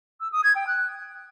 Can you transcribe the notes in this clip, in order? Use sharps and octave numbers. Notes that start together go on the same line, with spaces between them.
E6
D#6
G#6
G5
F#6